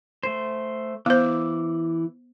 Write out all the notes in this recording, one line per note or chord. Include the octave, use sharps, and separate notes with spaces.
A3 C5
E3 B3 C5 D6 E6